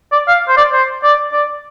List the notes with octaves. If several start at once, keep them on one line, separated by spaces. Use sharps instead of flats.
D5
F5
C5
D5
C5
D5
D5